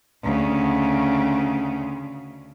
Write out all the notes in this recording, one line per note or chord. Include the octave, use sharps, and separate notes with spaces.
D2 C#3